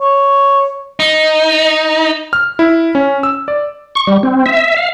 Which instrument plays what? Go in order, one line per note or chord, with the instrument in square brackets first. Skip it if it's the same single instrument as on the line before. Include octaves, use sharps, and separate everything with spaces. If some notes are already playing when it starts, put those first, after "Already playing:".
[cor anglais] C#5
[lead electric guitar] D#4
[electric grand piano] F6
E4
C#4
E6
D5
[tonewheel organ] C#6
G3
C4
E5
F5